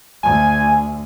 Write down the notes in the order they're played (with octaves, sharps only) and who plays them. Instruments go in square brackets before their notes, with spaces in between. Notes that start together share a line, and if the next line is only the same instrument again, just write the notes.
[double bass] D2 [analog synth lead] G#5